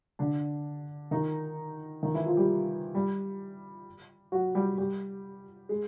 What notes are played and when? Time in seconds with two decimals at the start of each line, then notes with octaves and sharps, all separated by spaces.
0.19 D3 D4
1.11 D#3 D#4
2.03 D#3 D#4
2.14 E3 E4
2.26 F3 F4
2.37 G3 G4
2.94 G3 G4
4.32 F#3 F#4
4.55 G3 G4
4.78 G3 G4
5.69 G#3 G#4